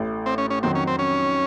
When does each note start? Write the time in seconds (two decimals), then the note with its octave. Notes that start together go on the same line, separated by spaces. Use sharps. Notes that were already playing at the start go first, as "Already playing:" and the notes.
Already playing: A1 A2 A3
0.26 C4
0.38 C#4
0.50 C#4
0.63 F2 D#3 F#3 C4
0.75 C#4
0.87 C4
0.99 C#4